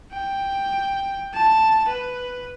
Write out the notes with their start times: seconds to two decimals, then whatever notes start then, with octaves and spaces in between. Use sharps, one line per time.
0.12 G5
1.34 A5
1.89 B4